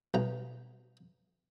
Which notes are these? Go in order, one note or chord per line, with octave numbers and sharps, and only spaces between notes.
B1 A#5